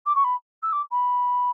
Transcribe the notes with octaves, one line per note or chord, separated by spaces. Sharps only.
D6
C#6
B5
E6
D6
B5